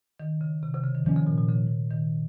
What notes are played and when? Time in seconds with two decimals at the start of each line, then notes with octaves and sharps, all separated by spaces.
0.20 D#3
0.41 C#3
0.63 C3
0.74 C3
0.84 C#3
0.95 D#3
1.05 C3 D#3 F3 A#3 C#4
1.16 C#3
1.27 A#2
1.38 A#2
1.49 C#3
1.91 D#3